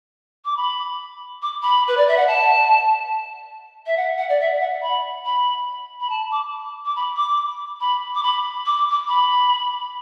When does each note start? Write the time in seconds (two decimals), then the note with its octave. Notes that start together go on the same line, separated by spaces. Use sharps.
0.45 D6
0.57 B5
1.42 D6
1.62 B5
1.87 B4
1.97 D5
2.08 E5
2.17 F#5
2.27 A5
3.86 E5
3.97 F#5
4.18 F#5
4.29 D5
4.40 E5
4.60 F#5
4.82 B5
5.25 B5
6.00 B5
6.09 A5
6.31 D6
6.85 D6
6.96 B5
7.16 D6
7.81 B5
8.15 D6
8.23 B5
8.66 D6
8.91 D6
9.08 B5